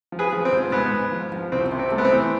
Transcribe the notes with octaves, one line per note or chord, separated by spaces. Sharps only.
F3
G#4 B4
F3
C4
G#2
G#2 B3
G#2
F3
F3
C2 C4
C3
C4
A3
B3
C4
E3